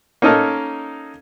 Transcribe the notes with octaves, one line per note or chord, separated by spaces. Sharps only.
A#3 C#4 D#4 A4 A#4